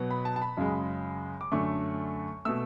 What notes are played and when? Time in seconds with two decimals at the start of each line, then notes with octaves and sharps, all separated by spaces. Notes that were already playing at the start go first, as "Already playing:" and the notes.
Already playing: B2 F#3 B3
0.11 B5
0.25 A5
0.36 A5
0.42 B5
0.57 F#2 C#3 G#3
1.41 D6
1.52 F#2 D3 A3 C#6
2.45 B2 A3 E6